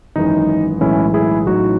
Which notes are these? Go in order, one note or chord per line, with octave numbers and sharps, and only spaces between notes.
G#1 F#2 E3 G#3 D#4
B1 A2 E3 G#3 C#4 E4
E4 G#4
A1 A2 F#3 D#4 F#4